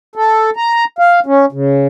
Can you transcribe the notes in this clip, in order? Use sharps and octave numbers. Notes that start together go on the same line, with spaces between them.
A4
A#5
F5
C#4
C#3